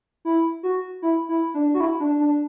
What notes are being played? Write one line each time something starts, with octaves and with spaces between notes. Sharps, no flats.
E4
F#4
E4
E4
D4
F#4
E4
D4
D4